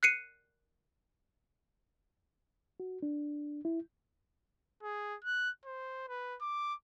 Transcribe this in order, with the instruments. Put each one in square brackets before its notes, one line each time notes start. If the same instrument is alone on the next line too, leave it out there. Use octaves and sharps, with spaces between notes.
[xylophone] F#6 C7 C#7 D#7
[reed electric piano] F#4
D4
E4
[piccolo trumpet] G#4
F#6
C5
B4
D6